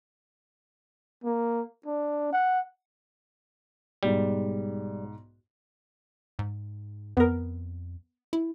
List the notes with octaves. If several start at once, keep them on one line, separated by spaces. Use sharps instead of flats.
A#3
D4
F#5
B1 G#2 G3
G#2
F2 B3 A#4
E4